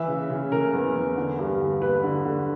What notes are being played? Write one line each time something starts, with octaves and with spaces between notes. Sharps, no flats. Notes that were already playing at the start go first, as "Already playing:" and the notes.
Already playing: E3 E5
C#3
C#3
C#3 A#4
E2
E2
D3
G2
D3
D3 B4
D3
D3